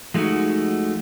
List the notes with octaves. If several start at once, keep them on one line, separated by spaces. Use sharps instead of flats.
F3 G#3 A3 D#4 F#4